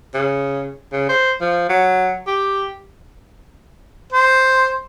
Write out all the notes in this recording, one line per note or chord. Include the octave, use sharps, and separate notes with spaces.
C#3
C#3
C5
F3
F#3
G4
C5